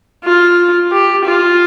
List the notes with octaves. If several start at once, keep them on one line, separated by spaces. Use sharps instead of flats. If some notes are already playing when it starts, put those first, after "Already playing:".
F4
G4
F4